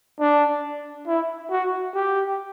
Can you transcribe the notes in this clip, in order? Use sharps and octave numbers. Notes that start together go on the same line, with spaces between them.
D4
E4
F#4
G4